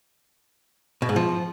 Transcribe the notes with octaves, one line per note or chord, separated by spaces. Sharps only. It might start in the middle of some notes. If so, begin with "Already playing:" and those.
B2
G#2
F3